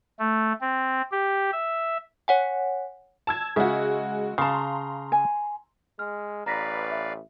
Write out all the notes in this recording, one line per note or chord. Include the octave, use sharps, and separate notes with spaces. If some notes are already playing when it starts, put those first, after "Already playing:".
A3
C4
G4
E5
C#5 F#5 G#5
A5 E6 G#6
C#3 G#3 F#4 E5
C#3 F5 A5 A#5 C6
G#5
G#3 F6
A1 B4 D5 F5 A#5 A#6 B6
E5